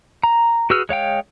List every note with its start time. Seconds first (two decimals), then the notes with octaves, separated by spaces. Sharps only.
0.24 A#5
0.70 F#4 G#4 B4 E6 F6
0.89 G#3 C#5 F5 G5